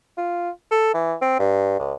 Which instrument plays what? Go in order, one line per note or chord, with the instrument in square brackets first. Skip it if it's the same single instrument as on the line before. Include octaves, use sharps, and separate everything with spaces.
[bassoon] F4
A4
E3
C4
G2
C#2